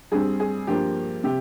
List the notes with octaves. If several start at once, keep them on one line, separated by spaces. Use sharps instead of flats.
G2 G3 C4 G#4
G#4
G2 F3 A#3 G4
C3 G4